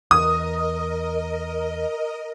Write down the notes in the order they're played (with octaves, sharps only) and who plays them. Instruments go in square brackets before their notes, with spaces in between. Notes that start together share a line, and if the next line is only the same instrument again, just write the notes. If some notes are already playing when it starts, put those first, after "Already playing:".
[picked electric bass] E2 [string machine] A#4 D#5 [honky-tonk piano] D#6